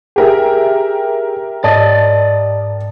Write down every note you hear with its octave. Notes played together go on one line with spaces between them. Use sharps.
G4 G#4 A#4 E5
G#2 D5 D#5 A5